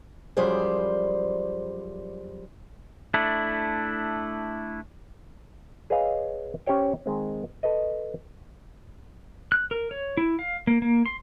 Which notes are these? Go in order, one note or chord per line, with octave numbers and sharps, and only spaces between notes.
F#2 F3 G3 G#4 C5 D5
A3 D4 E4
G#4 B4 C#5 D#5 F5
C#4 G4 C5 C#5 G5
D#3 G#3 C4
A4 B4 D#5
F#6
A#4
C#5
E4
F5
A#3
A#3
C6